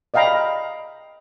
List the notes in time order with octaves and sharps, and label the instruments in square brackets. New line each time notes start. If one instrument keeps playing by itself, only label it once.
[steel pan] D5 D#5 F5 G5 A#5 B5